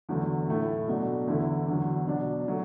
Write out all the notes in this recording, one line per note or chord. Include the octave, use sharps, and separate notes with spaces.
E2 D3 F#3 A3
A2 A3 E4
B2 F#3 A3 D4
E2 D3 A3 E4
E2 D3 F#3
B2 F#3 D4
B2 F#3 A3